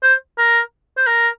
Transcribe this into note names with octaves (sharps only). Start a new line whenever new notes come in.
C5
A#4
C5
A#4